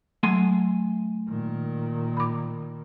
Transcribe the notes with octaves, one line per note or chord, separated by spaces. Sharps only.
F#3 A3 G#5 C6
A#2 D#3
B5 D6